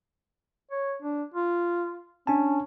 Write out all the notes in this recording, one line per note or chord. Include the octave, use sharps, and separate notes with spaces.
C#5
D4
F4
C#4 D4 G#5 A5